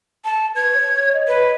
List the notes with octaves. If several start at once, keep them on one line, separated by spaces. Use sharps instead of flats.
A5
B4 G#6
C#5
D#5
B4